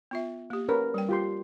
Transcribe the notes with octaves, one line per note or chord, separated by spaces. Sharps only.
B3 F4 E5
A#3 G4
C#4 A#4 B4
G3 G5
F4 G4 C6